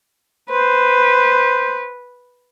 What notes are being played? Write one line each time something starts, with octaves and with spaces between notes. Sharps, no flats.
B4 C5